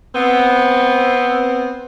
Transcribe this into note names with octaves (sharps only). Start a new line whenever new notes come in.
B3 C4